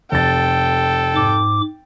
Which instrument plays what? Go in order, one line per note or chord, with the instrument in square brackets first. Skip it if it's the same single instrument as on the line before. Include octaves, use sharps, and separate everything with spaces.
[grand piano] F1 A6 [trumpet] A4 [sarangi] G5
[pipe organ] G#2 D6